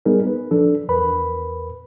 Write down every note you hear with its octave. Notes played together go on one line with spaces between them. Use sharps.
G3 B3 D#4 G#4 A#4
B4
F3 D4 A4
E2 A#4 B4 B5